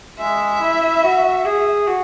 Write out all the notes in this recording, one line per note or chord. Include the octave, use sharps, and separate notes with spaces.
G#3 E5
E4
F#4
G#4
F#4